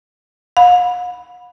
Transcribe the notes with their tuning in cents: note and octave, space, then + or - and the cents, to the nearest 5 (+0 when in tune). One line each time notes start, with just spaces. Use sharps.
F5 +45 B5 +0